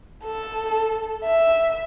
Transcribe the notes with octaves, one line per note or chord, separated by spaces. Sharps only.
A4
E5